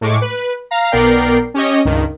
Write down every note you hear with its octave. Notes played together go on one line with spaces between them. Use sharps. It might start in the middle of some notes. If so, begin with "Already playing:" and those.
A2 G#3 C#6 D6
B4
F5 A#5
B1 B3 A#4 D5 G5 C7
C#4 G4 C#5 D#5
C#2 G2 D#3